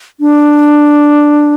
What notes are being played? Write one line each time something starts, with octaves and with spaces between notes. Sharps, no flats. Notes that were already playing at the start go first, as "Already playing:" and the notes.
D4